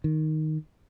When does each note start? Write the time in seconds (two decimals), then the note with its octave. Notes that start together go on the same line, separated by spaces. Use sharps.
0.04 D#3